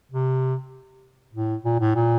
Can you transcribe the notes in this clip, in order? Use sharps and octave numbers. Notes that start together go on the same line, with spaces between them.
C3
A2
A#2
A2
A#2